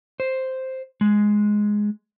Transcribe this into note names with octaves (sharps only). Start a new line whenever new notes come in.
C5
G#3